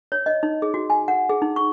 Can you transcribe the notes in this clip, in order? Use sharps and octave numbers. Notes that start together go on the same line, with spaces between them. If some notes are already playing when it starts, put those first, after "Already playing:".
C#5
D#5
D#4
G#4
F#4
G#5
F#5
G#4
D#4
C#6